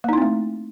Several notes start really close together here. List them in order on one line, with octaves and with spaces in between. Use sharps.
A#3 D#4 E4 C4 A3